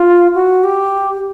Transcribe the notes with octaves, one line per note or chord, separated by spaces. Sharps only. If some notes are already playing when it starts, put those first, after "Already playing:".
Already playing: F4
F#4
G4